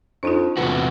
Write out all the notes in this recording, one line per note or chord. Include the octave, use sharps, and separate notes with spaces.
F2 D4 D#4 F4
E2 C3 B3 F#4